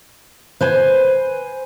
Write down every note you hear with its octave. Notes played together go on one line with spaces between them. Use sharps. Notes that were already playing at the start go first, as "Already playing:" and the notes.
B4 C5 G#5